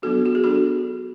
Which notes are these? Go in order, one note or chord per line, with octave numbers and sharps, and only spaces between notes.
F#3 B3 D4 F#4 A4
F#4
G#4
F#3 B3 D4 F#4 A4